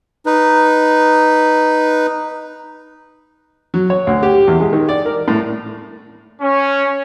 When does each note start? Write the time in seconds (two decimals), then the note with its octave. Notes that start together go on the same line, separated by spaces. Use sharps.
0.26 D#4 B4
3.74 F#3
3.90 C#5
4.07 D2
4.23 G4
4.48 E2
4.60 G#3
4.73 D#3
4.89 D5
5.06 A#4
5.28 A2
6.41 C#4